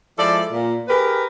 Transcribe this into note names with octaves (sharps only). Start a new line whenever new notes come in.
F3 G#3 E4 A4 D5
A#2
G4 G#4 A#4 B4